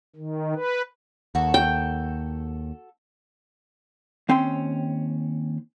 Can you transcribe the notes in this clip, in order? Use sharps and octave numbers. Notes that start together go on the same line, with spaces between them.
D#3
B4
D#2 F#4 A4
G5
D#2 C4 C#4 G5 C6